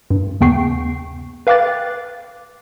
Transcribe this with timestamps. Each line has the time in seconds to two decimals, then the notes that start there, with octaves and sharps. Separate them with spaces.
0.10 G2
0.41 D#2 C#3 B3 G5 C#6 C7
1.47 B4 F5 G5 D6 F#6 A6